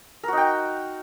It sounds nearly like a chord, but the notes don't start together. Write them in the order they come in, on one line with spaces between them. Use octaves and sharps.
A#4 F#4 D#4 G5